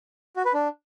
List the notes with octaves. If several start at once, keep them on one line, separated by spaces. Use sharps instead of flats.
F#4
B4
D4